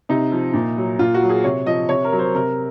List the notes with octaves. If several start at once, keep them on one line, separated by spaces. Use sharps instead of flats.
C3 D#4
F3
A#2
F#3
A#2 F4
F#4
F#3
G#4
C3 C#5
F3 D#5
C3 C#5
A#4
F#3
C5
C3 A#4